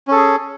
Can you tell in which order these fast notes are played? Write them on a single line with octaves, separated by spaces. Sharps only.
C#4 A4 G#4